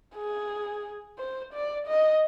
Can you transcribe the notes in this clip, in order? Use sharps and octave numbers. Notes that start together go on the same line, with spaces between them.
G#4
C5
D5
D#5